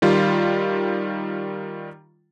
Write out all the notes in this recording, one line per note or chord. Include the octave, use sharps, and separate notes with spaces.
D#3 G3 F4